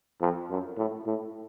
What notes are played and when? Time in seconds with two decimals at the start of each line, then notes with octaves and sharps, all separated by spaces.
0.21 F2
0.49 F#2
0.77 A2
1.06 A2